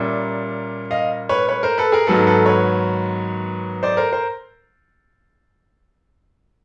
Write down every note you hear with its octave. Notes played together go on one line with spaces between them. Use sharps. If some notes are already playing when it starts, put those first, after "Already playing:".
Already playing: A#2 G3 A#3 C#4 D5 E5
D#5 F5
B4 C#5
B4 C#5
A#4 C5
A4 B4
G#4 A#4
G#2 D#3 F#3 B3 A4 B4
A4 B4
B4 C#5
C5 D5
A#4 C5
A#4 C5